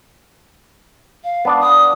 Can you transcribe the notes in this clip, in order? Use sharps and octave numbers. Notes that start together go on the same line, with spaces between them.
F5
B3 D4 D5
D#6